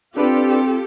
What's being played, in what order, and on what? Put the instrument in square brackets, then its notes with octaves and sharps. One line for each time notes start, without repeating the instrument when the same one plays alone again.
[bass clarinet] C4 [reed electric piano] D4 B4 D5 [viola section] F4 G4 A4